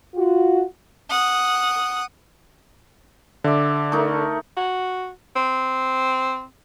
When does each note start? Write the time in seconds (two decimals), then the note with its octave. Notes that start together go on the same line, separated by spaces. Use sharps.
0.15 F4 F#4
1.10 F#5 D#6
3.44 D3 D5 E5
3.92 A3 D#4 A#4
4.57 F#4
5.36 C4